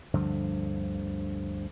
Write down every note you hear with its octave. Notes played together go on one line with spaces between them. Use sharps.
D2 G2 D3 F3